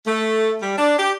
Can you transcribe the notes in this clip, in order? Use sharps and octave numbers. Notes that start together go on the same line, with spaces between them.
A3
G3
D4
G4